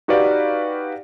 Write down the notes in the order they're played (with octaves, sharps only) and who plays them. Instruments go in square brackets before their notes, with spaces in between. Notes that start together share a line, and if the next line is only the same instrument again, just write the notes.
[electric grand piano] D#4 F#4 G4 B4 D5 F5